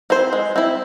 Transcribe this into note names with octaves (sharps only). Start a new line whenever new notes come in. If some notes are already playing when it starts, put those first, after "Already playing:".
C4 E4 C5
G#3
C4 E4 C5